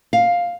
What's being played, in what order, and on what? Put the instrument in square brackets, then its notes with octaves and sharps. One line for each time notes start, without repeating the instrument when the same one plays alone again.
[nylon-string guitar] F5